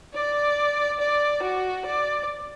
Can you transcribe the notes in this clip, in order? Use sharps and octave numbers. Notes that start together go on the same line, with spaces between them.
D5
D5
F#4
D5